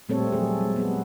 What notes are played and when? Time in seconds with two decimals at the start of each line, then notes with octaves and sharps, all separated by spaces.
0.09 A#2 G3 A3 C4 A4 C#5
0.32 F3 F#3 G#4
0.61 G#3
0.76 B3 G#4